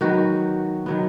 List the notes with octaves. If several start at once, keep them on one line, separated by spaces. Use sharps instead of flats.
D#3 F#3 B3 F#4
D#3 F#3 B3